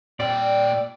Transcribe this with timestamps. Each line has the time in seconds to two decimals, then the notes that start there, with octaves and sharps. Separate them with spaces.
0.20 A#2 G3 C4 D5 G5